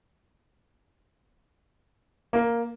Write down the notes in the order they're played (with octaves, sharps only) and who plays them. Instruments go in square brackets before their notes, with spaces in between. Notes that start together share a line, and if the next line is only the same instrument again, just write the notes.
[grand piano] A#3